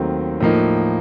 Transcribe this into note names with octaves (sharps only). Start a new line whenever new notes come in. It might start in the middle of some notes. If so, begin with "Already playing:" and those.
Already playing: D#2 D#3 F#3 A3 C4
A2 F3 A#3 D#4